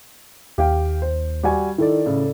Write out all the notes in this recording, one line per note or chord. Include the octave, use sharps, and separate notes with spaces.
D#2 G4 F5 G5
C5
G3 F#4 G#5
D#3 E4 A4 D5
A2 C#3